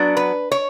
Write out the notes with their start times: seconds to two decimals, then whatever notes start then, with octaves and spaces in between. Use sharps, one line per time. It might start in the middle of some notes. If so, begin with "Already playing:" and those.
Already playing: F#3 B3 D4
0.17 B4
0.52 C#5